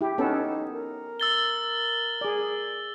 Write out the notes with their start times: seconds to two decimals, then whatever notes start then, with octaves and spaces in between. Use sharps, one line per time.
0.01 E4 G4
0.18 B3 C#4 D#4 A4
0.71 A#4
1.20 E6 A6 G7
2.21 G#4 D5